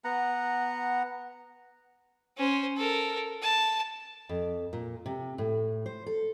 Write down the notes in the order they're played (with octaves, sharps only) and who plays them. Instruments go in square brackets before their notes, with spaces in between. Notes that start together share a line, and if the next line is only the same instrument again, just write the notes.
[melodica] B3 F#5 A#5
[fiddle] C#4 C5
A4 A#4
A5
[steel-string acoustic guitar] F2
A#2
C3
A2
C5
A4